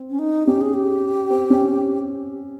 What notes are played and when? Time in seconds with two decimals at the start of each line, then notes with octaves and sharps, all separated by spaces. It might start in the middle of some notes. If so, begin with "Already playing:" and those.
Already playing: C4
0.10 C#4
0.19 D#4
0.47 C#4 G4
0.61 G#4
0.74 G4
1.30 C4
1.50 C#4